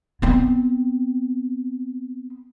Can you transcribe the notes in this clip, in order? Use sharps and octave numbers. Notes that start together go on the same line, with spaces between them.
B3 C4